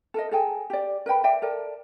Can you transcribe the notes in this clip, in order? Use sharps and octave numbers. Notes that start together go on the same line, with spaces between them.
A4 A#4 D#5
G#4 A4 G5 G#5
G4 D5
A#4 B4 G5 B5
D5 E5 G5
A4 A#4 D5